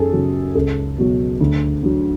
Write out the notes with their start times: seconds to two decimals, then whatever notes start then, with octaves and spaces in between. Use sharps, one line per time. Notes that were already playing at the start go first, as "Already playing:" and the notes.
Already playing: F#2 G#4 A4
0.13 C#3 F#3
0.55 C#2 A4
0.98 B2 F#3
1.40 D2
1.83 D3 F#3